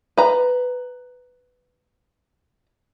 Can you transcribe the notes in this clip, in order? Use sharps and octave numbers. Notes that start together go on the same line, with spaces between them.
B4 A#5